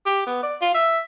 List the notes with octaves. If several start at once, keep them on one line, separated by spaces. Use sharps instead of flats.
G4
B3
D5
F4
E5